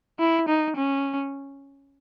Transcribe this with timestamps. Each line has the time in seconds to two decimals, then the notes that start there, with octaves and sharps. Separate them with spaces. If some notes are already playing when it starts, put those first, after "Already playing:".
0.20 E4
0.49 D#4
0.77 C#4